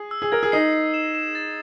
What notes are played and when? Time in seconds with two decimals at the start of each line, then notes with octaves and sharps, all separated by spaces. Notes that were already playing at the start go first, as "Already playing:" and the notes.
Already playing: G#4
0.11 E6
0.22 G#4
0.32 A#4 G#6
0.43 G#4
0.52 D#4 C7
0.73 C7
0.94 E7
1.15 E7
1.35 A6